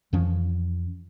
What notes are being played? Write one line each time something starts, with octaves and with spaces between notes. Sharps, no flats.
F2 E3 F3 C#4